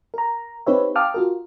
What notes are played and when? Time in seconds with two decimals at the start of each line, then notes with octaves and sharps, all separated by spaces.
0.14 A#4 A#5
0.66 C4 D#4 G4 B4 C#5 E5
0.95 F5 G5 A5 D6 D#6 F6
1.14 F4 F#4 A#4